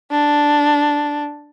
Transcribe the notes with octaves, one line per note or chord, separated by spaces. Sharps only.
D4